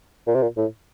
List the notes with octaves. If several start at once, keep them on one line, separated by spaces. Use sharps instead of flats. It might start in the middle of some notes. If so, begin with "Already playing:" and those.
A#2
C3
A#2
A2